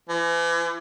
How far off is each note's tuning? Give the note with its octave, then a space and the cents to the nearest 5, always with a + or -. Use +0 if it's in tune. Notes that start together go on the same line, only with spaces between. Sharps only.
E3 +40